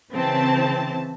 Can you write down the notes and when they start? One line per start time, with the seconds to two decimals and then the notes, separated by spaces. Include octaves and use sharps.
0.12 C#3 E3 C4 A5